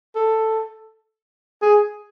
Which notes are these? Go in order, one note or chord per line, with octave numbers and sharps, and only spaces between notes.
A4
G#4